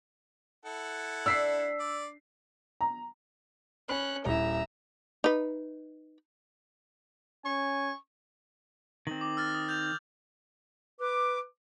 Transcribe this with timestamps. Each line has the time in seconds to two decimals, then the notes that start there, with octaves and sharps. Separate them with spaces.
0.66 E4 A4 F#5
1.26 D4 E6 B6 C7
1.80 D5
2.81 A#5
3.89 C#4 B5 F#6
4.26 D#1 E4 E5 A#5
5.24 D#4 B4
7.45 C#4 G#5 C#6
9.07 D#3 C4 F#7
9.21 D6
9.37 E6 F6 A6
9.54 D#6
9.69 G6 F7
11.00 B4 D6